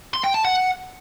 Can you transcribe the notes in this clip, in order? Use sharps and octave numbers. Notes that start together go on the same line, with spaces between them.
C6
G5
A5
F#5